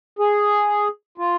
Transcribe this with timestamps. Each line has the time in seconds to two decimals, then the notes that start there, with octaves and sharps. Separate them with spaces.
0.19 G#4
1.18 F4